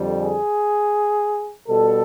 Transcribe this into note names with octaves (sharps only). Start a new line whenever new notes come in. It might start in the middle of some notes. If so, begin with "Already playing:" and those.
Already playing: F2 D3 G3
G#4
B2 G3 A4